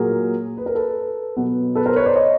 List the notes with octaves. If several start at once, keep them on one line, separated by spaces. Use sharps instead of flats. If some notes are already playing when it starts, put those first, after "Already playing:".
Already playing: A#2 F#3 A#3 G#4 A#4
B4
A#4
A4 B4
B2 F#3 B3
A4 B4
A#4 C5
B4 C#5
C5 D5
C#5 D#5